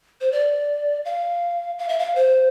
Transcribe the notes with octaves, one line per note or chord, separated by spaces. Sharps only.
C5
D5
F5
F5
E5
F5
C5